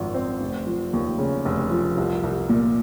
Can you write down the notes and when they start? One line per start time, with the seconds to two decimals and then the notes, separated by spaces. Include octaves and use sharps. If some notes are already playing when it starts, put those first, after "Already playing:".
Already playing: G#1 F#2 F3
0.14 C4
0.41 F1
0.67 F3
0.93 D#2
1.18 C#3
1.45 F1
1.71 F3
1.97 C2
2.23 C2
2.49 A#2